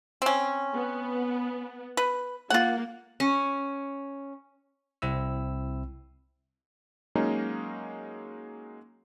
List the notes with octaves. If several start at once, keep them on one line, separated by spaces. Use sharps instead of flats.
C4 C#4
B3
B4
A#3 F4 F#5
C#4
C2 C4 E4 E6
F#3 G#3 A#3 C#4 D#4